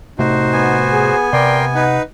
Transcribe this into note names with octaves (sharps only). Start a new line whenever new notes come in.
A2 C3 A3 D#4 F#4 C5
B3 G#5
G#4
C3 A#4 D5 G5 C6
D#4 B4 F#5